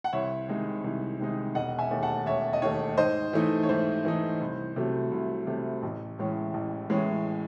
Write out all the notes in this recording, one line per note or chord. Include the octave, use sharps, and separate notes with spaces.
F#5
C2 C#5 E5
C3 D#3 G#3 D#4
C2
C3 D#3 G#3 D#4
E1 D#5 F#5
E5 G#5
D#2 D#3 A3
F#5 A5
E1 C#5 E5
D#5
D#2 D#3 A3 C#5
G#2 C5 D#5
E3 A3 D#4
C#5
G#2 C5
E3 A3 D#4
C2
C3 F#3 A3
C2
C3 F#3 A3
A1
A2 E3 G#3 C#4
A1
A2 E3 G#3 C#4